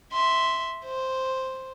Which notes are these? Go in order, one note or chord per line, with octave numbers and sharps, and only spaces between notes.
E5 C6
C5